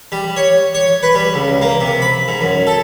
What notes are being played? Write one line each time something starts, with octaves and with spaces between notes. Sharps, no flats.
G3
C#5
C#5
B4
G3
C#2
A#3
C3
B5
G#2
F#2
A4